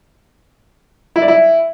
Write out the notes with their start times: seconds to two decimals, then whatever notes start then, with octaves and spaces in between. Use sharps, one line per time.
1.16 E4
1.22 D5
1.28 E4